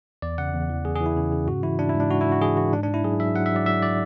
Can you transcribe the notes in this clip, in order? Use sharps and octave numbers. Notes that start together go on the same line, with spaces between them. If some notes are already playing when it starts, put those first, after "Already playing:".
E2 D5
C#3 F#5
E2
E3
E2 G#4
G#4
E3
E4
C#3
C#3
G#2 F#4
E3 E4
G#2 D4
E4
G#2
D4
G#2 F#4
E4
G#2
F#4
E3 G#4
E3 F#4
G#2 D4
D4
G#2
E4
F#3 G#4
F#3 E5
F#3 F#5
E5
F#3 D5
F#3 E5
D5